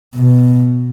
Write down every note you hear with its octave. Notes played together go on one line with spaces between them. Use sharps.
B2